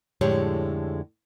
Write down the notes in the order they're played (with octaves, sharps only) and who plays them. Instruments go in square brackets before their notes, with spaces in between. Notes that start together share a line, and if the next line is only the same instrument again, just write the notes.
[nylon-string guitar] F2 A2 D3 G#3 G4 C#5